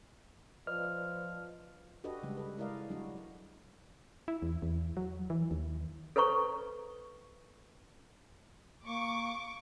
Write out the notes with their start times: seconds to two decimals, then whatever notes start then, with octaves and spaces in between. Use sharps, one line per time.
0.67 F3 B4 D5 D#5 F6
2.04 D4 F#4 G4 A4 B4 D#5
2.23 C#3 G3 G#3
2.37 A4 B4
2.58 G#3 E4 A#4 D5 D#5 F5
2.89 F#3 G3 D4 F#4
4.28 E4
4.42 E2
4.62 E2
4.97 F#3
5.30 E3
5.51 D#2
6.16 A4 B4 C5 A#5 C#6
8.85 A#3 C#6 D6